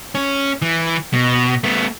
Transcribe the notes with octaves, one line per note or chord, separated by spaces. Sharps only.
C#4
E3
B2
A3 B3